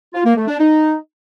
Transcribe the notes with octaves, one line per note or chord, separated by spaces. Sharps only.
F4
A#3
A3
D4
D#4